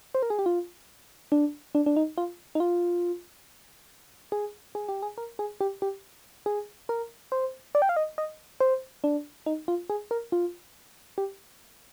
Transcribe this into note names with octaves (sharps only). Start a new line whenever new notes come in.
C5
A#4
G#4
G4
F4
D4
D4
D4
D#4
F4
D#4
F4
G#4
G#4
G4
G#4
A#4
G#4
G4
G4
G#4
A#4
C5
D5
G5
F5
D#5
D#5
C5
D4
D#4
F4
G#4
A#4
F4
G4